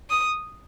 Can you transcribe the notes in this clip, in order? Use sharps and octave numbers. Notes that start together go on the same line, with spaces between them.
D#6